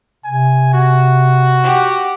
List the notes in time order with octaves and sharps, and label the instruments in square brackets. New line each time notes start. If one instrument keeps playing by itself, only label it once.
[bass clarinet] C3 [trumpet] G#5
[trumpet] F#4
[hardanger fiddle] G4 F#5